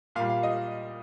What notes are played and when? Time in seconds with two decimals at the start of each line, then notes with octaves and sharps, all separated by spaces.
0.15 A#2 F5
0.20 G3
0.29 F5
0.43 D#5